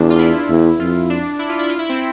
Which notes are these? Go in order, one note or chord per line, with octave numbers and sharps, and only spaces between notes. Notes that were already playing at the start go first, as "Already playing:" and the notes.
Already playing: E2 D4
F4
E4
E2
F2 F4
D4
E4
F4
E4
F4
E4
C4